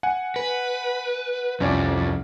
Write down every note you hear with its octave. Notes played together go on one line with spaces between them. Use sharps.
F#5 G#5
B4
C2 F2 C#4 D5